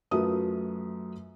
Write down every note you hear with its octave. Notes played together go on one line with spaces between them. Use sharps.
F#2 F#3 A3 F4 B4 D#6